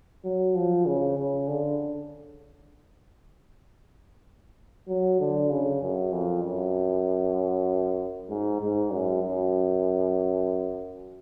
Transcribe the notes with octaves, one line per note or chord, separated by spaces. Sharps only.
F#3
F3
C#3
C#3
D3
F#3
D3
C#3
F#2
F2
F#2
G#2
G#2
F#2
F#2